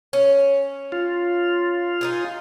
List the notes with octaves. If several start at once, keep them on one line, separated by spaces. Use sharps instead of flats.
C#4
F4
D#4 E4 G#4